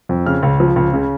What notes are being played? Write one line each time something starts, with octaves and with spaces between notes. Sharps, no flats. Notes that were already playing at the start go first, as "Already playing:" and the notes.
F2
C#3 F6
C#2
F3
C#2
C#3